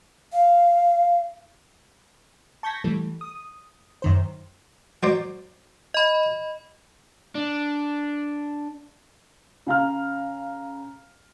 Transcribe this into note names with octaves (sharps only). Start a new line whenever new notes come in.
F5
A5 C#6 G6 G#6 A#6 B6
E3 G3 A3
D#6
F#2 D#3 C5
F#3 C5 D5
D#5 B5
D4
C#3 F5 A#5 F6